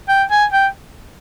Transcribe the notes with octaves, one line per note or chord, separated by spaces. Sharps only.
G5
G#5
G5